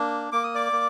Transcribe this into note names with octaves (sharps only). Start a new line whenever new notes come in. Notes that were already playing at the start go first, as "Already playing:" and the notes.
Already playing: A#3 D4
A#3 D6
D#6
D5 D6
A#3